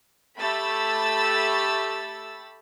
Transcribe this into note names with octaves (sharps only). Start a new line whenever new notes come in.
A3 G4 B5 E6 A6